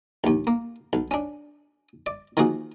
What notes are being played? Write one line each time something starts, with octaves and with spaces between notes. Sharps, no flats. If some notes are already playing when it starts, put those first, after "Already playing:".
A#1 D#2
A#3
B1
C#4 D4
D5
D#3 F3 A#3 F#4 G#4